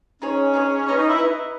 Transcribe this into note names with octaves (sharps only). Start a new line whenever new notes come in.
C#4 D#4 G#4 C#5
D#4 G#4 C#5
C#4 B4 D#5 A#5 C#6
D#4
E4
B4 D#5 A#5 C#6